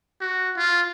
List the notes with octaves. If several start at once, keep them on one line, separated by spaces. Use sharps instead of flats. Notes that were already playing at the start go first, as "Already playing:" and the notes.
F#4
F4